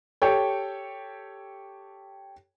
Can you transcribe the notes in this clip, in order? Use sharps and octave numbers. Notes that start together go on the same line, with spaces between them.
G4 A4 C#5 G5